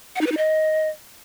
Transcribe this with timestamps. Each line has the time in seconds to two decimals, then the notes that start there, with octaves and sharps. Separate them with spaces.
0.16 F#5
0.21 D#4
0.26 B4
0.32 D#4
0.37 D#5